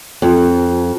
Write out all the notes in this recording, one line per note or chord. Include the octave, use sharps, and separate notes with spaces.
F2